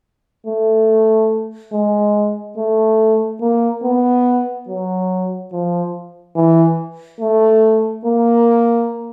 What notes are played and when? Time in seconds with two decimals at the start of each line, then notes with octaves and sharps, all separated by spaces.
0.47 A3
1.73 G#3
2.58 A3
3.41 A#3
3.84 B3
4.68 F#3
5.53 F3
6.36 E3
7.20 A3
8.05 A#3